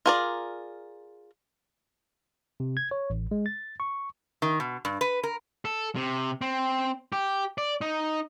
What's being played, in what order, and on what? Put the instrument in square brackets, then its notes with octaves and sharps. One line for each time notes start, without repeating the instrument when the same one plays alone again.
[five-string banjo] F4 G#4 A#4 C#5 D5
[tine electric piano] C3
G#6
C#5
A1
G#3
A6
C#6
[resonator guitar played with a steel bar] D#3
B2
G2
B4
A#4
[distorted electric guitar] A4
C3
C4
G4
D5
D#4